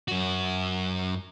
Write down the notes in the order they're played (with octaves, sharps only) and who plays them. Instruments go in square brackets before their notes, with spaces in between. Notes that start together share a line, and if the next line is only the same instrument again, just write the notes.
[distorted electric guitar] F#2 F#4